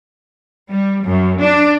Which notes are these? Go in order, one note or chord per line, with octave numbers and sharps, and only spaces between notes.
G3
F#2
D4